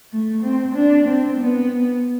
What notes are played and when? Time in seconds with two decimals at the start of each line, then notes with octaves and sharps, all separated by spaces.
0.12 A3
0.43 C4
0.75 D4
1.07 C4
1.39 B3